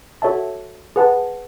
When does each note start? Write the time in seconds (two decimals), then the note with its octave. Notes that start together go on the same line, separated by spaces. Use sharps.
0.22 F#4 A4 C#5 E5 A5
0.96 G#4 B4 F#5 A5